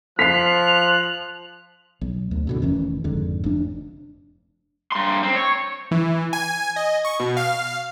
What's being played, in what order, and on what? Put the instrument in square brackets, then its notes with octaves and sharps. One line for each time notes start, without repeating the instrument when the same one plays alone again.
[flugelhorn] F3 [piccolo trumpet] F#6 [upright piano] B6 C7 [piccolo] F7
[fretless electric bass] B1
D2
F2 B2 D3
F1 D#3 E3 C#4
G#1 F2 G#2 D3
F1 D4
[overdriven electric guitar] G2 C6
C4
C#5
[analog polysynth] E3
G#5
D#5
C#6
B2
F5